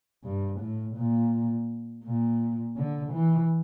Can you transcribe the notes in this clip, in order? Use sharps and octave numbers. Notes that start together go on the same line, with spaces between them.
G2
A2
A#2
A#2
D3
E3